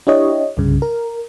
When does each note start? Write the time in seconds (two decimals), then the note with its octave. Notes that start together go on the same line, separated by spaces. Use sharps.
0.07 D4 E4 G4 C#5 D#5
0.57 C2 G2 C#3
0.82 A#4